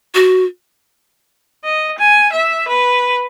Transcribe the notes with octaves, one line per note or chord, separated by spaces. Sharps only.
F#4
D#5
G#5
E5
B4